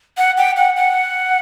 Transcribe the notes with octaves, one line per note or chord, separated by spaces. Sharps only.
F#5
G5
F#5
F#5